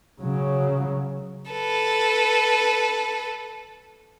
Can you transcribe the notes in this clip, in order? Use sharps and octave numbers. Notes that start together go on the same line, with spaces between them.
C#3 F#3
A4 B4